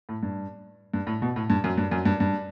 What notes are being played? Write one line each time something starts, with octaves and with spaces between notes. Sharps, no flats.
A2
G2
G2
A2
B2
A2
G2
F#2
G2
F#2
G2
G2